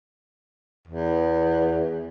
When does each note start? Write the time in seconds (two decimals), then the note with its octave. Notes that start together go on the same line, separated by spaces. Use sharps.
0.88 E2